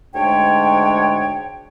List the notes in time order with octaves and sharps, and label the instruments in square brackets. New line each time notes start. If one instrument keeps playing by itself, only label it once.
[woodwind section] D2 G#2 G#3 D4 C#5 G5